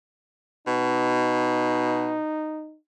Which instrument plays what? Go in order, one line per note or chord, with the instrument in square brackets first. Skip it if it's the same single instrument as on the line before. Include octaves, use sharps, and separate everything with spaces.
[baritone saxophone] B2 [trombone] D#4